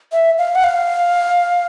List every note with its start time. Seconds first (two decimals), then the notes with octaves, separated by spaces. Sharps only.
0.13 E5
0.38 F5
0.55 F#5
0.64 F5